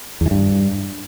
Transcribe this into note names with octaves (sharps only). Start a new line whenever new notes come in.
E2
E3
G2